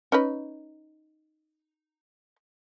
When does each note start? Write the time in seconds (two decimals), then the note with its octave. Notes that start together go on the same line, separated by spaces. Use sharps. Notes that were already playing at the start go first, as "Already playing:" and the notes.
0.12 C#4 D#4 B4